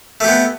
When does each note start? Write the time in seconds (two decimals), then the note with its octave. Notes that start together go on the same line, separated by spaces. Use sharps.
0.20 A3
0.24 G4
0.28 B3